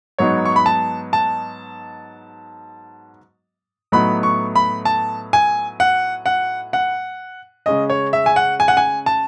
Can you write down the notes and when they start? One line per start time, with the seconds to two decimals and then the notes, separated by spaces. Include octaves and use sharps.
0.18 G#2 F#3 B3 D#4 C#5
0.46 C#6
0.56 B5
0.66 A5
1.13 A5
3.92 A2 F#3 B3 D#4 B5
4.23 C#6
4.56 B5
4.85 A5
5.33 G#5
5.80 F#5
6.26 F#5
6.73 F#5
7.66 C#3 G#3 C#4 D#5
7.90 C#5
8.13 E5
8.26 G#5
8.36 F#5
8.60 G#5
8.68 F#5
8.77 G#5
9.06 A5